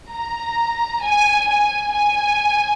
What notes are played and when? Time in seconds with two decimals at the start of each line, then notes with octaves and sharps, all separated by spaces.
0.11 A#5
1.03 G#5
1.49 G#5
1.95 G#5